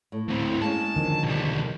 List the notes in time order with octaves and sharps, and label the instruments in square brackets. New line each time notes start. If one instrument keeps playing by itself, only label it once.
[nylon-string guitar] A2
[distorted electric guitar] D2 C4
[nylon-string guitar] G#3 A#3 C#4 [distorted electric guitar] A5
[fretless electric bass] D3 D#3 F3
[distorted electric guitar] B1 G3